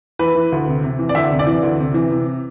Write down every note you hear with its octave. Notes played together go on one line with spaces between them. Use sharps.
E3 B4
E3
D2
C3
C3
E3
D5
D2 E5
C3
D5
E3
D2
C3
E3
C3